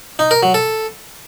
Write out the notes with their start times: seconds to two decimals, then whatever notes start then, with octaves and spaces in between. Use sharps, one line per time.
0.19 D#4
0.31 A#4
0.43 F#3
0.54 A4